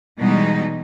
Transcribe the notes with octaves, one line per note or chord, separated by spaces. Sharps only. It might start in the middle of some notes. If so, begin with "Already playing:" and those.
B2 E3 G3 G#3 D#4